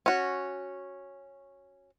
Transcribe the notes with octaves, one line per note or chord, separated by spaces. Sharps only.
C#4 F#4